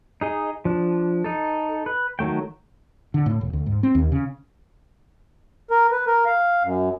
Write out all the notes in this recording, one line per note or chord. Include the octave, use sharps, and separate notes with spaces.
D#4 G#4 D#5
F3 D4
D#4 A4
B4
D#3 F#3 A3 G5
D3
A2
E1
D2
G#2
C4
D#2
C#3
A#4
B4
A#4
F5
F#2